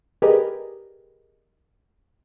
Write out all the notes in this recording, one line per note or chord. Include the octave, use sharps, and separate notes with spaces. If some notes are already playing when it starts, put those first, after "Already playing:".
G4 G#4 A#4 B4 D5 D#5